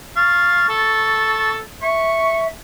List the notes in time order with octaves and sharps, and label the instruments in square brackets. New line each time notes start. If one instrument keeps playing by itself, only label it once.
[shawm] F5 [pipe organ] C#6 A6
[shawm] A4
[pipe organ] E5 [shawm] C#6